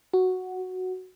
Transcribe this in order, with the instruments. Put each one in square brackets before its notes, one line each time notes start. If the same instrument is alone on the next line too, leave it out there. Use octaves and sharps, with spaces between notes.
[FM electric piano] F#4